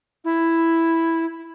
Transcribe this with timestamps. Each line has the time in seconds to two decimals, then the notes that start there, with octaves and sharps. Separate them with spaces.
0.25 E4